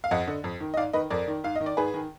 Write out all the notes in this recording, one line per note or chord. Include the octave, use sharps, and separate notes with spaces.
F5
F2 D#5 F#5
D3
F2
D#3
D#5
G#2 D5 F5
D#3 B4 D#5
F2 A#4 D5
D#3
G#2 F5
D#5
D#3
D5
G#2 G#4 B4
D#3